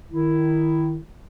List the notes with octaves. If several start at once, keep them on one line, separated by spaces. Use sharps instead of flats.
D#3 E4